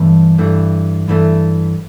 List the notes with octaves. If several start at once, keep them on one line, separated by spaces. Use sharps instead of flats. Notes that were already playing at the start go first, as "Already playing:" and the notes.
Already playing: G2 E3 A3
G2 E3 A3
G2 E3 A3